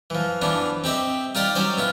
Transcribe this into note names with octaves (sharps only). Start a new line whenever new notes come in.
E3 F3
E3 F3 B3 D4
C4 G4 D#5 E5
D#4 F4 G4 D5 D#6
F#3 C#4 C5 D5
B3 E4 F4